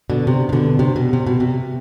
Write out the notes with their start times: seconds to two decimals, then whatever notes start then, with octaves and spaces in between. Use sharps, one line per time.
0.10 B2 D3
0.27 C3
0.49 C3
0.53 B2 D3
0.79 C3
0.96 B2
1.13 C3
1.27 B2
1.40 C3